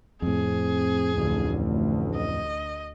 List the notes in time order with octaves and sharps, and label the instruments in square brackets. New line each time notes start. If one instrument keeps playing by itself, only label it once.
[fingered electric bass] F2 A2 [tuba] C4 [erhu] G#4
[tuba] A1 [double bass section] D2
[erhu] D#5